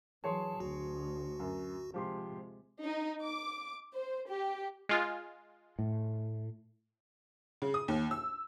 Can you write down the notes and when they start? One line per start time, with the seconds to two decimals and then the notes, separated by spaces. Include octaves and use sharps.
0.24 E3 F#3 G#4 C#5 A5 C6
0.60 D2 F#4
1.39 F#2
1.94 C3 F3 G#3 G4 C6
2.82 D#4
3.23 D6
3.94 C5
4.29 G4
4.89 G#3 F4
5.79 A2
7.62 C#3
7.74 D#6
7.88 D#2
8.11 E6